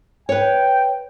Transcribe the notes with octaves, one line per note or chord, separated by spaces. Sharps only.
B4 C#5 G5